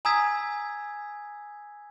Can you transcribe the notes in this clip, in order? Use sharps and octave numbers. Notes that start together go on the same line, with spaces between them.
G#5 A#5 D#6 E6 G#6 B6